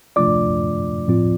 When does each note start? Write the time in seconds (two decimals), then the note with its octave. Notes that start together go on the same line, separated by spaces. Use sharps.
0.16 C3 F3 A3 D4 F4 D5 D6
1.08 A2 F3 C4 F4